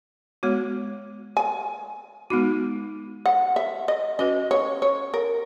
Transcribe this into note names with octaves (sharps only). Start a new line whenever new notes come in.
G#3 B3 F#4 C#5
G#5
G#3 B3 D#4 F#4
F#5
E5
D#5
C#4 F#4 B4 D#5
C#5
C#5
A#4